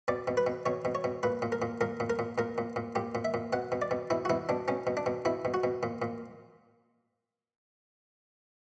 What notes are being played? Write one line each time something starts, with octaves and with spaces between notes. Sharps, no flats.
B2 D5
B2
B4
B2
B2 C#5
B2
C#5
B2
A#2 B4
A#2
A#4
A#2
A#2 A#4
A#2
A#4
A#2
A#2 A#4
A#2
A#2
A#2 G4
A#2
E5
A#2
B2 F#5
B2
D5
B2
B2 E4
F#4
B2 E4
B2 D4
B2 C#4
B2
D4
B2
B2 E4
B2
F#4
B2
A#2
A#2